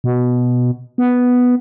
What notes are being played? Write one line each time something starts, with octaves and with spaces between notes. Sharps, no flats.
B2
B3